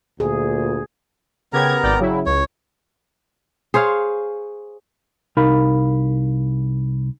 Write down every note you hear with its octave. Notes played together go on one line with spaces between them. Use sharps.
D2 A#2 G#4
C#3 B3 G4 A#4 A#5 G#6
G#1 D5 G5
C#3 F#3 E4
C#2 C#5
G#4 C5 C#5 F5
C2 D#4 A#4 F5 B5